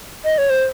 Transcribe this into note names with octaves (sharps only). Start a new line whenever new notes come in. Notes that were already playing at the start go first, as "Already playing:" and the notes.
D#5
C#5
C5